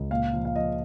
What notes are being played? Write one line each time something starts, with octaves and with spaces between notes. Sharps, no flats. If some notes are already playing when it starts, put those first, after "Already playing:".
Already playing: C#2
A#2 F5
F3
F5
F3 D#5